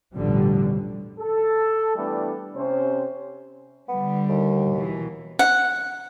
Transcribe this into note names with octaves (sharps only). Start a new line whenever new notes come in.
A1 E2 B2 D3 F3 G3
A4
E3 G3 A3 B3 D4 E4
C3 C#4 C5
D3 G3 B3
D#2
B2 E3
F#5